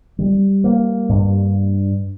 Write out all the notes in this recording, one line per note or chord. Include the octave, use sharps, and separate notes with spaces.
G3
A#3
G2